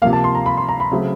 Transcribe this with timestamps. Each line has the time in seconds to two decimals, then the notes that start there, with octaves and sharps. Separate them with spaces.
0.02 C3 F3 A#3 F5
0.13 A5
0.24 C6
0.35 A#5
0.46 B5
0.57 C6
0.69 A#5
0.80 B5
0.91 C#3 F#3 A3 C4